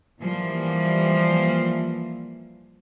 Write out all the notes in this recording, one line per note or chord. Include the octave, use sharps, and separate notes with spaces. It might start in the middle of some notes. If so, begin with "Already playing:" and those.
E3 F3 G3 A#3